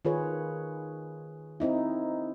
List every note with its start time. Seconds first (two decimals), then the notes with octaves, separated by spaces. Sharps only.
0.05 D#3 F4 G#4 B4 C#5
1.60 C4 D#4 E4